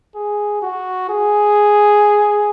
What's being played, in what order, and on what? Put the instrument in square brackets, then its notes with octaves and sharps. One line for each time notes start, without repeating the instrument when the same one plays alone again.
[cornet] G#4
F#4
G#4